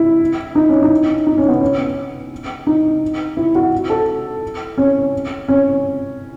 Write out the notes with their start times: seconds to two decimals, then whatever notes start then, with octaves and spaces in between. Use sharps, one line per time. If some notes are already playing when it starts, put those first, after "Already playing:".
Already playing: E4
0.55 D#4
0.69 C#4
0.82 D#4
1.27 D#4
1.38 C#4
1.48 B3
1.61 C#4
2.67 D#4
3.37 E4
3.55 F#4
3.90 A4
4.78 C#4
5.48 C#4